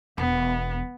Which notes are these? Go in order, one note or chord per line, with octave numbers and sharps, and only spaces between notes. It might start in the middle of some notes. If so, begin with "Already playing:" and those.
E1 B3